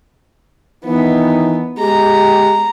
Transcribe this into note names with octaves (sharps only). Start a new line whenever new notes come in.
D#3 E3 B3 D#4
G#3 G4 A#5